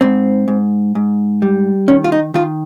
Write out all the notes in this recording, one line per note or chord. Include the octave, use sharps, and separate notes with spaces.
G#2 C4
G#2
G#2
G3
D#3 C#4
F4
D#4
D#3 F4